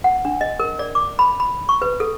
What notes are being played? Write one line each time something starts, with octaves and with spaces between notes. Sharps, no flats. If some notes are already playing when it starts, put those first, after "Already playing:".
F#5
D4
D#5
A#4
D5
D6
B5
B5
C#6
B4
A4